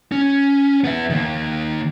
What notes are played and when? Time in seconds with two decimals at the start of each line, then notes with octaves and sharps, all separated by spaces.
0.12 C#4
0.84 B3 E5
1.10 D#3 A#3